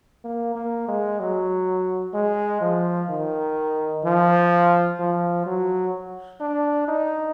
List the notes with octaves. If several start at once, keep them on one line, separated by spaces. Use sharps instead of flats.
A#3
A#3
G#3
F#3
G#3
F3
D#3
F3
F3
F#3
D4
D#4